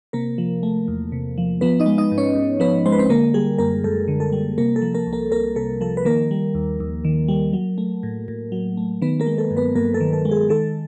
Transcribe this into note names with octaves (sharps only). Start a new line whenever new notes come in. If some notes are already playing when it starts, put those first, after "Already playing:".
C3 A#3 A#4
F3
A3
E2
C3
F3
F3 B3 B4
D#4 D#5
G#3
D#4 D#5
G#2
C#4 C#5
G#2
F3 B3 B4
G#3 C5
B4
C4 C5
D3 A#3 A#4
G3 G#4
F#2 A#3 A#4
F#2 A4
D3
A4
G3
C3 A#3 A#4
A4
F3
A#3 A#4
C2
A#3 A#4
C2 A#3 A#4
C3 A4
F3 A4
B4
D#3 A#3 A#4
G3
D#2
D#2
D#3
G3
F#3
A3
A2
A2
F#3
A3
D#3 B3 B4
A#3 A#4
G#3
A4
G2
B3 B4
G2 A#3 A#4
A4
D#3
A4
G#3
G#4
D#3 A4